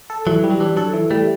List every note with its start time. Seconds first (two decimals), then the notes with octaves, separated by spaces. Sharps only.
0.10 A4
0.26 E3 F#3
0.44 G3
0.50 F#3
0.60 E3 D4
0.77 F#3 A4
0.93 E3
1.11 G3 A3